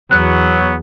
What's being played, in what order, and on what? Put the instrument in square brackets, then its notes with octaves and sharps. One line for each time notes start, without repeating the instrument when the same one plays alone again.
[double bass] E2 [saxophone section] F#3 [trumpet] B3 [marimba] F#6